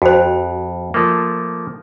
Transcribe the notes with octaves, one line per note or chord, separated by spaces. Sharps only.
F2 F#4 C5
F3 A3 A#3